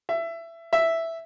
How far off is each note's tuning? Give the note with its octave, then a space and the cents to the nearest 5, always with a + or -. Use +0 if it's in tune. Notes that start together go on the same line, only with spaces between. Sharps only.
E5 +20
E5 +0